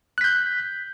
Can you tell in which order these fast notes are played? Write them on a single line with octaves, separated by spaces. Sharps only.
F#6 B6 G6